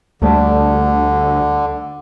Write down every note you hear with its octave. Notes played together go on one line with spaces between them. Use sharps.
D2 D3 G3 A3 D5